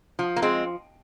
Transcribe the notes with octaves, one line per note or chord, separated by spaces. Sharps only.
F3
A#3
G#3 C4